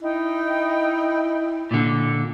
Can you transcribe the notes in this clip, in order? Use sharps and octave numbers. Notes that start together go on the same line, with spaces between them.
D#4 E4 D#5 G5
A#2 D3